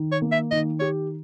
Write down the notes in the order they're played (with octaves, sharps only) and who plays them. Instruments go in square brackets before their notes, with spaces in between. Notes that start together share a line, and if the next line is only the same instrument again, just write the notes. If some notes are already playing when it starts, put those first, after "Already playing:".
Already playing: [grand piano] D#3
[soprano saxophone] C#5
[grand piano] A#3
[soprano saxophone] E5
[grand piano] D#3 [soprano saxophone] D#5
[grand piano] G4 [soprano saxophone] C#5